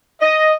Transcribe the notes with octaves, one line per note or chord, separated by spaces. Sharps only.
D#5